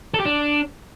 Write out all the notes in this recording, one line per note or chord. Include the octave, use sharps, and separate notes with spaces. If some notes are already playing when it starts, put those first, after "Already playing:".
A4
G4
D4